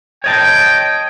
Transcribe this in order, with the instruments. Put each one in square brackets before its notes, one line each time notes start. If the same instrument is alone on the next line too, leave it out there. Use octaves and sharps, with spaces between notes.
[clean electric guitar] C#5 D#5 A5 [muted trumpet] G5